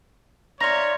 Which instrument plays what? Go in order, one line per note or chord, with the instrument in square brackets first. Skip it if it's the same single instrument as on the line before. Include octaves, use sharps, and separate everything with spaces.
[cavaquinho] D#4 F5 C6 [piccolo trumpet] C#5 [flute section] D5 E5 [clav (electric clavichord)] A#5